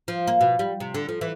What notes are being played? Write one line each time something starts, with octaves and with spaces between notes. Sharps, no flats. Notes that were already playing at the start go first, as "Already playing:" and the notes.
F3
A#3
B2
G3
C3
D3
F3
E3